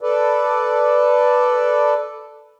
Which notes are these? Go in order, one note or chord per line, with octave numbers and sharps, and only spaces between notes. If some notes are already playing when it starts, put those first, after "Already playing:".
A4 B4 D5